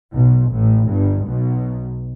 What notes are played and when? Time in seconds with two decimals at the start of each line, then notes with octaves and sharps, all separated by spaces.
0.14 B1 B2
0.51 A1 A2
0.89 G1 G2
1.26 B1 B2